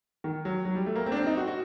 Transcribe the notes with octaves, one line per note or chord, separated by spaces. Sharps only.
D#3
F#3
F#3
G3
A3
A#3
C4
D4
C4
D#4
F#4
F#4